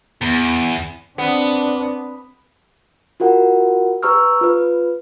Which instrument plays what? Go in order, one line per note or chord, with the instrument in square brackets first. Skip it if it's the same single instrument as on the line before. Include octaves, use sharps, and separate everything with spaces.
[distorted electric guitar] E2 [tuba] B3
[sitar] B3 [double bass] C4 D4
[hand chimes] F4 F#4 A#4 F#5
G4 B4 A#5 C#6 E6 F6
F4 B4